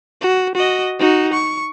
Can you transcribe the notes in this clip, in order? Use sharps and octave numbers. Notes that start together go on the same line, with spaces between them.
F#4
F#4 D#5
D#4 F#4
C#6